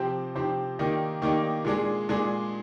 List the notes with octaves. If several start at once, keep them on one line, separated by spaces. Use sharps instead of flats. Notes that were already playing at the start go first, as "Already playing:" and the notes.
Already playing: C3 F3 C4 G4 C5
C3 F3 C4 G4 C5
D#3 A#3 D#4 G4 D5
D#3 A#3 D#4 G4 D5
A#2 G#3 D4 G#4
A#2 G#3 D4 G#4